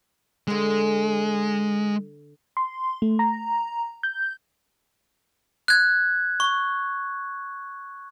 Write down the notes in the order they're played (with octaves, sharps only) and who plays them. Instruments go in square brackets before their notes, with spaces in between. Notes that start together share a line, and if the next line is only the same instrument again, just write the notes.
[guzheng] D3 C4 [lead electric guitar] G#3
[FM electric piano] C6
A3
A#5
G6
[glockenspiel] F#6 G#6
C#6